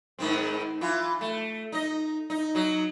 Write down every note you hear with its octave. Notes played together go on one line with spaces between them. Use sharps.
G#2 D#3 C4
E3 F4
A3
D#4 D#5
D#4
F#3 D#4